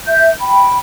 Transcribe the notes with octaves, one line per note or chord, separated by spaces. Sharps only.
E5 G6
G5 B5